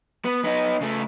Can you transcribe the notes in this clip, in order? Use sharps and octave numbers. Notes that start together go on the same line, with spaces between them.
B3
B3 D#4
C#3 A3